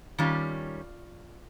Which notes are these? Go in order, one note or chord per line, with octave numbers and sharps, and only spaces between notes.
D#3 G3 C#4 F4